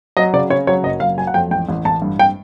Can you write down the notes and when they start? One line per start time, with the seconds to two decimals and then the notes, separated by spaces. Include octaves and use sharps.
0.17 F#3 D#5
0.33 C#3 D5
0.50 C#3 C#5
0.67 F#3 C#5
0.83 F#1 D#5
1.00 F#3 F5
1.17 F#3 G#5
1.27 F#5
1.34 F2 G5
1.51 A1 G5
1.69 A1
1.85 A1 A5
2.02 G2
2.19 G5